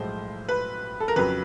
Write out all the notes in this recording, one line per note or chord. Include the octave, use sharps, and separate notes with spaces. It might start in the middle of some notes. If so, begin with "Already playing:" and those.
Already playing: B1 A2 F3 G#3 C5
B4
A4
A#4
F2 C#3 F#3 B4